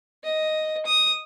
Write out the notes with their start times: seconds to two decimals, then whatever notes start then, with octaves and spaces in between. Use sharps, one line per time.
0.24 D#5
0.86 D#6